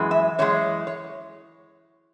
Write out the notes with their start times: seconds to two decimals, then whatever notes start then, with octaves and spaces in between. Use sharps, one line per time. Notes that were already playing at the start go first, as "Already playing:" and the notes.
Already playing: F#2 E3 G#3
0.11 E5
0.38 F#2 E3 G#3 C#5
0.87 C#5